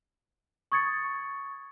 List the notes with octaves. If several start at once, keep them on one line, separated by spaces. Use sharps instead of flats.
C#6 D#6 G#6 A6 C#7